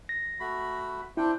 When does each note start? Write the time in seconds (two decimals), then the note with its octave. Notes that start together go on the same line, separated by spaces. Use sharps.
0.09 A#6
0.40 A3 F#4 B5
1.17 C4 D4 E4 G5